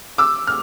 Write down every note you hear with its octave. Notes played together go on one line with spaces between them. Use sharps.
D6 E6
F6